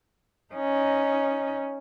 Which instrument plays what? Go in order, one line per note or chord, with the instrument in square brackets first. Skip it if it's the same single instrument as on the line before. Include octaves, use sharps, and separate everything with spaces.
[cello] C#4 D#4